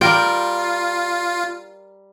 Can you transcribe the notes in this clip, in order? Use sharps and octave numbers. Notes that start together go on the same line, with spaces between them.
G3 F4 A#4 G5